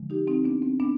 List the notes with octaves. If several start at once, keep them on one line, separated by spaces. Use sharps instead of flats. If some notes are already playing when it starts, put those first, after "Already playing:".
Already playing: D3 F3 G#3
D#4 G4
C4 D#4
B3 D4
C4
B3 D4